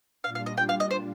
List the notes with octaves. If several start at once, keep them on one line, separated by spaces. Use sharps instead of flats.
A#2 G3 D4 F4 F5
F5
D#5
G5
F5
D#5
C5